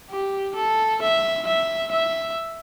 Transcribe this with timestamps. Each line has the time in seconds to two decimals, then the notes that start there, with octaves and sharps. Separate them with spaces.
0.10 G4
0.56 A4
1.02 E5
1.47 E5
1.92 E5